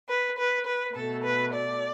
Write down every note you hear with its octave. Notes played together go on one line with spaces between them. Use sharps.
B4
B4
B4
B2 A3 A4
B4
D5